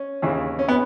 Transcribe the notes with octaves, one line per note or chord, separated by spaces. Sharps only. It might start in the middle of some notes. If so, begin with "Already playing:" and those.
Already playing: C#4
D#2 C#3 E3
C#4
B3